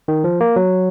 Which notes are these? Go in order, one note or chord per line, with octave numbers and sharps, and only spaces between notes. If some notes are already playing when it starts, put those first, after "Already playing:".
D#3
F3
A#3
F#3